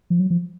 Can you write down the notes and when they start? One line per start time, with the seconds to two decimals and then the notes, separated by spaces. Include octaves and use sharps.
0.10 F3
0.20 F#3
0.30 F3